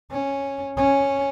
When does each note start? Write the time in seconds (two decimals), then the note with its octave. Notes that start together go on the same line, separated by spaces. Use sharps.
0.11 C#4
0.77 C#4